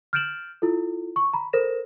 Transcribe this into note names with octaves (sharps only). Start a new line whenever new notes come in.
F6 G6 A6 D7 E7 F#7
E4 F4 A4
C#6
A#5 B5
A4 A#4 C5 A#6 E7